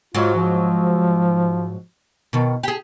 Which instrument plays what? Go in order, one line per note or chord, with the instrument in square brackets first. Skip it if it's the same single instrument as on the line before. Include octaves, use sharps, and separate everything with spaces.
[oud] G#2 F#3 [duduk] F4
[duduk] F3
[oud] B2 D#3
G4 G#4